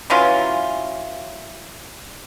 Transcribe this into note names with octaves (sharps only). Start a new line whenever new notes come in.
E3 F#3 C#4 F4